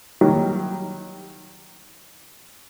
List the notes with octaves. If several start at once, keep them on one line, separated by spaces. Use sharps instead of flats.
D#3 F#3 G3